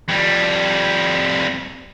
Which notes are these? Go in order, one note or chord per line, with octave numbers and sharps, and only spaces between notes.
F2 G3